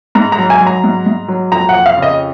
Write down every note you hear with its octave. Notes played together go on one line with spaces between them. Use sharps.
G#2 A#5
A#5
F#3
G#5
F#3
A#5
G#2
G#2
F#3
F2 A#5
F#5
F2
F5
C#3
D#5